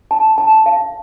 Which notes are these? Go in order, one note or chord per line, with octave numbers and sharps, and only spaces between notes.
A5
A5
F5